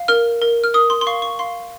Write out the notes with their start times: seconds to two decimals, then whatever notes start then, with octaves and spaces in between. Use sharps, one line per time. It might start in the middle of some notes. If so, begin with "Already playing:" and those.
Already playing: F5
0.08 A#4 F6
0.42 A#4
0.64 F6
0.74 A#4 D#6
0.90 C6
1.01 C6
1.07 F5 C#6
1.22 C#6
1.39 F5 C6